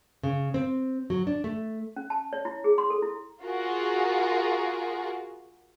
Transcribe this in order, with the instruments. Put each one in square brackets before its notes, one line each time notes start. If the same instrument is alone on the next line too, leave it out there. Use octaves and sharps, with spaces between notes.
[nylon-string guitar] C#3
C4
F#3
D4
A3
[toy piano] C#4
A5
C#5
E4
G#4
C6
A4
E4
[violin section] F4 F#4 G#4 A#4